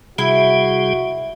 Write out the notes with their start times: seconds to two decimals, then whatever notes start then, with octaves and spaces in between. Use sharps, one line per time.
0.18 C3 G3 E4 F#4 G#4